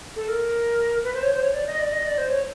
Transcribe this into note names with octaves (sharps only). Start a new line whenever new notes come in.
A4
A#4
B4
C5
C#5
C5
C#5
D5
D#5
D5
D#5
D5
C5
C#5